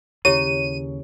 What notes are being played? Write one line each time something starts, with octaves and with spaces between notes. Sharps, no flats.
D#2 C#3 E4 G4 C#5 D#7